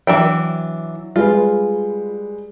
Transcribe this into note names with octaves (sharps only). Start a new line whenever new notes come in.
E3 F#3 D4 G5
G3 G#3 F4 B4